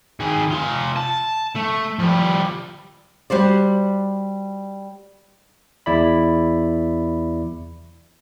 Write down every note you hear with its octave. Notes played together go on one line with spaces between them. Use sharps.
D#3 G#4
F4 G#5
A5
A3
F3 G3
G3 F#4 C5 D5
E2 E4 D5 B5